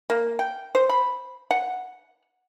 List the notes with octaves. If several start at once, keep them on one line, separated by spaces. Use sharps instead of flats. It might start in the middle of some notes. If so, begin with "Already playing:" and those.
A#3
G5
C5
B5
F#5